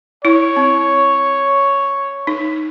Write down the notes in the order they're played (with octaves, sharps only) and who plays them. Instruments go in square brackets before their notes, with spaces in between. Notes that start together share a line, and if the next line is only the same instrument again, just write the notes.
[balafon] E4 [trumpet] C#5
[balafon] C4
D#4